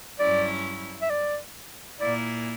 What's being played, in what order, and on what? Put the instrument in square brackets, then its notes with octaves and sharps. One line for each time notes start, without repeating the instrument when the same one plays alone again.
[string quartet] G2 F#3 C#4 E4 [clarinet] D5
[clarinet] E5
D5
[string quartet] A#2 A#3 E4 [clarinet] D5